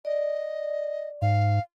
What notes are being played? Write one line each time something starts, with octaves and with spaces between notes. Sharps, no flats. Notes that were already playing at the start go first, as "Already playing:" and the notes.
D5 D#5
G#2 F5